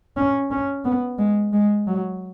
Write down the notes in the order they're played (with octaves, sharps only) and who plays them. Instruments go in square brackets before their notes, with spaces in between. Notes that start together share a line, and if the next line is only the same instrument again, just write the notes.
[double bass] C#4
C#4
B3
G#3
G#3
F#3